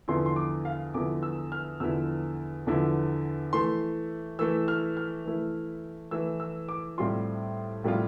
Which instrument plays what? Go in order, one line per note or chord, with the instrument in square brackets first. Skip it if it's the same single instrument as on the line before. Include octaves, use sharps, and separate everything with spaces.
[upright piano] E2 D3 F3 B3 E4 C6
C6
D6
F5
E2 D3 F3 B3 E4 D6
E6
F6
E2 D3 F3 B3 E4 E6
E2 D3 F3 B3 E4
E3 A3 E4 C6
E3 A3 E4 E6
F6
F6
E3 A3 E4
E3 A3 E4 E6
E6
D6
A2 G3 C4 F4 C6
A2 G3 C4 F4